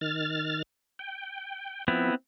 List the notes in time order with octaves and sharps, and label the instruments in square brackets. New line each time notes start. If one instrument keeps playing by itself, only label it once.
[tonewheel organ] D#3 F6 A6
G5
[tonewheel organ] F3 [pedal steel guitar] B3 C4 E4